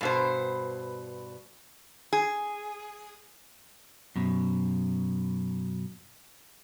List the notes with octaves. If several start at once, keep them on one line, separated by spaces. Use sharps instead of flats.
G2 B2 C5
G#4
F#2 B2